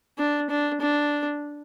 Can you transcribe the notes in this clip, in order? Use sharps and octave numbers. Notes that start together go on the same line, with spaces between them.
D4
D4
D4